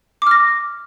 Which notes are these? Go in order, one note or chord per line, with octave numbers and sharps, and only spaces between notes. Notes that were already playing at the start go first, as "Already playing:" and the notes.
D6 F6 A#6